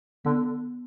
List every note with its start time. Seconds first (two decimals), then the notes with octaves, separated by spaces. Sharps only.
0.25 D3 B3